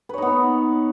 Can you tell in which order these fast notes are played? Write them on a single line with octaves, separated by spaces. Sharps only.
B4 C#5 D#4 B3